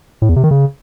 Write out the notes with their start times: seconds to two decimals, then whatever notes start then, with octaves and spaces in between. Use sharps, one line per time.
0.22 A2
0.29 E2
0.36 C3
0.44 D#3
0.51 C#3